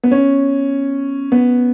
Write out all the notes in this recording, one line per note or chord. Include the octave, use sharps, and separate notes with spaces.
B3
C#4
B3